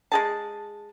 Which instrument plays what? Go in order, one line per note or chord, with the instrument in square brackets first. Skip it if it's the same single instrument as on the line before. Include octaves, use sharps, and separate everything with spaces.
[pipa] G#3 G#4 A5